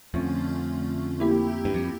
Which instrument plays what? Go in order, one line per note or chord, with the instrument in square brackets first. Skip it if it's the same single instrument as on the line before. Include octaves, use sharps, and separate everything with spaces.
[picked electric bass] F2 [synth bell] D3 A3 C#4 F4
[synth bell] A#3 E4 G4
[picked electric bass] G2
F2